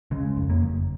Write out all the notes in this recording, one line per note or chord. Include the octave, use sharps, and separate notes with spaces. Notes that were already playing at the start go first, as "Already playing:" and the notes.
C#3 G#3
F2
A#3
F#1